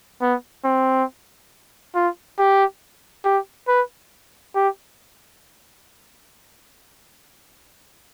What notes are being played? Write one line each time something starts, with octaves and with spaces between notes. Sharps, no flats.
B3
C4
F4
G4
G4
B4
G4